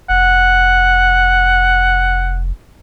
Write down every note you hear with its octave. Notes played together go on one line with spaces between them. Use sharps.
F1 F#5